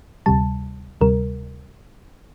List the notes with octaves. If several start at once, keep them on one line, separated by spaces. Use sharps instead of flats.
D2 C3 G3 A5
D2 C3 G3 A#4